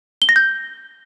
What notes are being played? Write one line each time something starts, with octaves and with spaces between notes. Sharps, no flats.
G7
A#6
G6